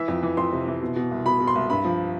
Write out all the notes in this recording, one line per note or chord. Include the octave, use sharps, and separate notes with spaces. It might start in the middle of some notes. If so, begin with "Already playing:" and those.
Already playing: E3 E5
F2
E3
F2 C6
C3
E3
B2
B2
C2
B2 B5
B2
C6
C2
G2 B5
F3